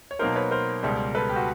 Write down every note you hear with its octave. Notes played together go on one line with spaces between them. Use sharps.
C#5
B2 F#3 A#3 D#4 A#4 C5
B4 C#5
A#4 C5
C#2 B2 G3
A4 B4
G4
F#4